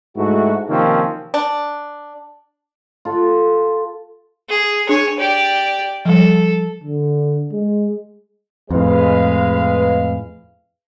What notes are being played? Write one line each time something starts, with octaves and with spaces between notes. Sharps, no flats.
G#2 A3 E4 F#4
C3 D#3 F3 A#3 C4 C#4
D4
F4 A4 F5 F#5
G#4
D4 G#4 C#5 G#5
G4 D5
F3 G3 A4
D3
G#3
F2 A2 G#3 B4 F5